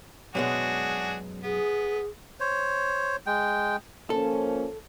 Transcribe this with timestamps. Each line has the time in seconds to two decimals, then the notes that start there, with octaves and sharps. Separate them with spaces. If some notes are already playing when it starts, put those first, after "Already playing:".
0.35 F#2 B2 G#3 D4 F#4 G#4
1.44 B3 G#4
2.40 C5 C#5
3.26 G#3 G5
4.10 F3 A#3 C#4 A4